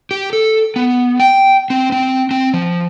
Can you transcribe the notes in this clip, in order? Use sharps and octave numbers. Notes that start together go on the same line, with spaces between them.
G4
A4
B3
G5
C4
C4
C4
F3